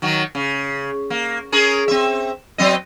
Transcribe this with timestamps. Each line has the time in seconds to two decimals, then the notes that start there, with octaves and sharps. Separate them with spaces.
0.02 D#3 F#3
0.35 C#3
1.10 A#3
1.52 C#4 G#4 A#4
1.88 C4 E5
2.58 F#3 C4 D#5